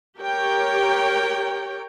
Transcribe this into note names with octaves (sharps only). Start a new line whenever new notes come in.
G4 A#4 C#5 G5